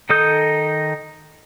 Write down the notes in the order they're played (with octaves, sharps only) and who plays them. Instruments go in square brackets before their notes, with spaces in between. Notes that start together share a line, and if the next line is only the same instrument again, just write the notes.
[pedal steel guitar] D#3 D#4 A4 D#6 G6